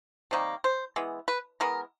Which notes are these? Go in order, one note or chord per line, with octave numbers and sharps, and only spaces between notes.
C3 D#3 G3 A#3
C5
E3 G#3 B3
B4
E3 G#3 B3 A#4